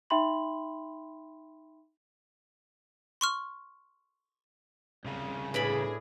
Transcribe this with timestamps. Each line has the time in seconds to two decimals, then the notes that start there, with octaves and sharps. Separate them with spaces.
0.10 D#4 E5 G5 B5 C6 F#7
3.21 C6 C#6 F6
5.04 C2 C#3
5.54 A2 D4 G#4 B4 D5 B5